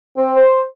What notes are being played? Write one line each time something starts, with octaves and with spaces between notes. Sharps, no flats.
C4
C5